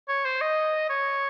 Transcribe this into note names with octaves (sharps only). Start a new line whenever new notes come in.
C#5
C5
D#5
C#5